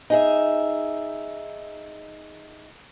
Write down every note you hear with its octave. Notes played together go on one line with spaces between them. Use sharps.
D#4 G#4 E5